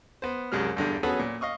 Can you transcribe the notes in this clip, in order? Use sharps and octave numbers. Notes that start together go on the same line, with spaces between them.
B3 C5
C2 F#2 G3 G#3 F6
E2 G2 D3
B3 C#4 F#4 G#4 A4 B4
A#2
D#5 F5 C#6 D#6